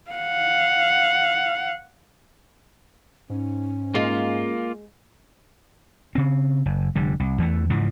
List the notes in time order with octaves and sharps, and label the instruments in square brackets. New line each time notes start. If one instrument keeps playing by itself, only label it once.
[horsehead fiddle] F5 F#5
[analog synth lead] G#2 [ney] C#4
[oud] G#3 [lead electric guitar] A#3 F4
[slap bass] C#3 C4
F#1
F1 D3 G3
C2
E2 E3 A3
G#2 C#3 E3 F3